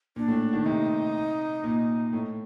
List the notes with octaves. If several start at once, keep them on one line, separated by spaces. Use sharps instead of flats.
A#2 D4
A2
D#3
C3 D#4
A#2
A2